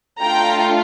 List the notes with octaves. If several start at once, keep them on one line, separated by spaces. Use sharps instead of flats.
A3 D4 F4 A4 G5 A#5